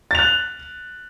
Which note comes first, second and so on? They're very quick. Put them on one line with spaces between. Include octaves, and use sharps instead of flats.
A6 F7 F#6